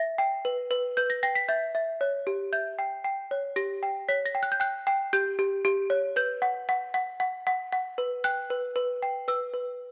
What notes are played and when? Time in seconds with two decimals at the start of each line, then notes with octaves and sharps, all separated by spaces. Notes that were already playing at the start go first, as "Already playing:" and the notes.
Already playing: E5 A#6
0.18 G5
0.45 B4
0.71 B4
0.97 B4 G6
1.10 A#6
1.23 G5 A#6
1.35 B6
1.48 E5 G6
1.75 E5
2.01 C#5
2.27 G4
2.53 E5 G6
2.79 G5
3.04 G5
3.31 C#5
3.56 G4 A#6
3.83 G5
4.09 C#5 B6
4.26 A#6
4.35 G5
4.43 F#6
4.52 G6
4.60 G5 F#6
4.87 G5
5.13 G4 G6
5.39 G4
5.65 G4
5.90 C#5
6.16 B4 G6
6.42 F#5
6.69 F#5
6.94 F#5
7.20 F#5
7.47 F#5
7.72 F#5
7.98 B4
8.24 G5 F#6
8.50 B4
8.76 B4
9.03 G5
9.28 B4 E6
9.54 B4